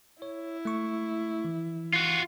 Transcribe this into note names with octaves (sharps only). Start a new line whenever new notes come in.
E4 C#5
A3 C#6
E3
F4 F#4